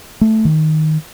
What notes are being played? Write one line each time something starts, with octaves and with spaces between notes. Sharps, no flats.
A3
D#3